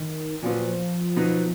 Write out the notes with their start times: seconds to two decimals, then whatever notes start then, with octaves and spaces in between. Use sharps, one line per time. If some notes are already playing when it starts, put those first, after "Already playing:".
Already playing: D#3
0.42 A#2 F3 F#3 B3
1.16 B2 F#3 B3 D#4